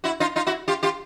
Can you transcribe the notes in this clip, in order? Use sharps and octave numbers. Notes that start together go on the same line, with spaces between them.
E4 F#4
D#4 F4
D#4 F4
E4 F#4
F4 G4
F4 G4